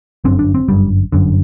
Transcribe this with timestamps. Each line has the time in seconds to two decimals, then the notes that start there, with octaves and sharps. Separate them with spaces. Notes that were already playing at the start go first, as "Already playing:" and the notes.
0.24 G1 F#2 D3 C4
0.39 D4
0.54 C4
0.68 G1 F#2 D3 G3
1.12 G1 F#2 D3